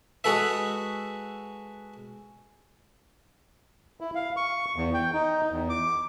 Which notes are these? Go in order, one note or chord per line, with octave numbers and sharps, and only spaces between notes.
G#3 F#4 A4 B4 E5
E4
F5
C#6
E2
G5
D#4
E2
D6